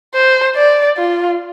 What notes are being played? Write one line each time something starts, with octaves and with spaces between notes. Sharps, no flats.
C5
D5
F4